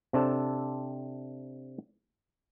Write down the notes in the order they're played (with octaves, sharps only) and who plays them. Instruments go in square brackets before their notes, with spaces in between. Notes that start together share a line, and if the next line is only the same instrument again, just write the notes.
[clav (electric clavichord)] C3 C4 D4 A4